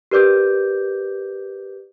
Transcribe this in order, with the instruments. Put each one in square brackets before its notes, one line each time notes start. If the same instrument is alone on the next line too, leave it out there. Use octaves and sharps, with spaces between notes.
[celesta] G4 A#4 B4 D5 D6 G6